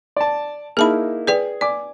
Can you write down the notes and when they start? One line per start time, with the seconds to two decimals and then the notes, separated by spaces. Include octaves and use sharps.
0.16 D5 A5
0.77 A#3 D#4 E4 G#4 A5 B5
1.27 G#4 B4 D5 G5
1.61 D5 G#5 D6